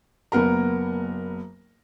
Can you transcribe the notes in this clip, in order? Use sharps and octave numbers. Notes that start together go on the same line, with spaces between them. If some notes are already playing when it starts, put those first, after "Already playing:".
F#1 A#3 B3 A#4 A#5